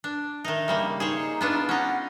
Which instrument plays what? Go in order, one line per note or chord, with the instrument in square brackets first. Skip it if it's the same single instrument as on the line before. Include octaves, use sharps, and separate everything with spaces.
[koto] D4
[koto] D#3 D#4 [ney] E5
[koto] C#3 G3 A#3
[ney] D#4 [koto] G#4 C5 C#5
[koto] B3 D4 F4
[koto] C#4 D#4 [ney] F#5